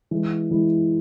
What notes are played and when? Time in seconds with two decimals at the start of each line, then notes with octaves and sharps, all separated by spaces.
0.11 E3 G#3 E4
0.50 E3 G#3 E4